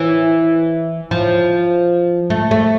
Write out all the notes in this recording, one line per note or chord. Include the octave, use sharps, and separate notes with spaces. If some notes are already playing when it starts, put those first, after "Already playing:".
Already playing: E3
F3
A3
A3